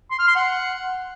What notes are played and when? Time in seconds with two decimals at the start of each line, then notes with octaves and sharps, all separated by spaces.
0.11 C6
0.19 F6
0.27 C6
0.35 F#5